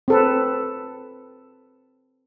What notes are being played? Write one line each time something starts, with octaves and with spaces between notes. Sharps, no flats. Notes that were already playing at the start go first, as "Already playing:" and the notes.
C4 A4 B4